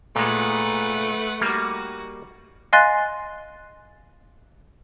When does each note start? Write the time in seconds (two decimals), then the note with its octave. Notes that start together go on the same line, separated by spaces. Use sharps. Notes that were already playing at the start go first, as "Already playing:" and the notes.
0.16 A#2 G#3 A3 B4 F#5
1.41 G3 A#3 D#4 F#4
2.73 D#5 F5 G#5 C6 F#6 A6